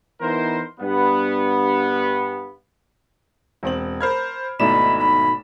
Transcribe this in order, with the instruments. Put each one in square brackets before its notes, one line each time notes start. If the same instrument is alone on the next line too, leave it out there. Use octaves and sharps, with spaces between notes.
[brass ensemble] E3 B3 D#4 E4 A#4 C5
G2 B3
[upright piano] E1 C4 F#7
[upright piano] A#4 B5 [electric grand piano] C5 F6 G#6
[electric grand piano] G#1 E4 E7 [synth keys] B2 A3 D#4 [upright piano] D5 [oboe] B5
[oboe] B5